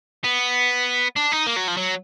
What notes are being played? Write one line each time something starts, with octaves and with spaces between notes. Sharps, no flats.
B3
D4
D#4
A#3
F#3
F3
F#3